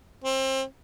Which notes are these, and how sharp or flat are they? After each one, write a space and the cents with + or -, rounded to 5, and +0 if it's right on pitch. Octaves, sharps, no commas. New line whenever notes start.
C4 +30